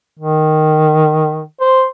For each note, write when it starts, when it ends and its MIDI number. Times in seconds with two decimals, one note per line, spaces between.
0.19 1.43 51
1.61 1.84 72